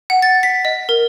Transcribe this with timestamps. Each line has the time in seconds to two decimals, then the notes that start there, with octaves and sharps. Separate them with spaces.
0.10 F#5
0.22 A6
0.43 B6
0.65 D#5
0.89 A#4